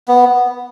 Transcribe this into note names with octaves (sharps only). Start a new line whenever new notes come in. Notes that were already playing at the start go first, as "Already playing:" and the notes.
B3